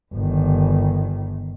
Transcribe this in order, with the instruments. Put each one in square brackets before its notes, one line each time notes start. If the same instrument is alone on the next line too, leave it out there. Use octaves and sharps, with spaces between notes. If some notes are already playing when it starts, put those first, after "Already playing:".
[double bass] G1 D#3